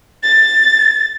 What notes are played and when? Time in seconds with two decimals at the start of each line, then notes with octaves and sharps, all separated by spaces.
0.23 A6